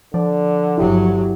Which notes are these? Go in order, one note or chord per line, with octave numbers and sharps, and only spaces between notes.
D3 F3 D5
G1 F#3 E4 G4